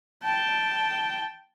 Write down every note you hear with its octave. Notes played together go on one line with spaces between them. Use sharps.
G5 A5